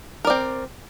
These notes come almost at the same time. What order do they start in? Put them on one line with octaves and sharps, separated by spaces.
A#4 D5 C4